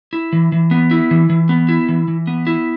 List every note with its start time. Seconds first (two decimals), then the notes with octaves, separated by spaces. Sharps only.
0.13 E4
0.33 E3
0.52 E3
0.71 B3
0.91 E4
1.11 E3
1.30 E3
1.49 B3
1.69 E4
1.89 E3
2.08 E3
2.27 B3
2.47 E4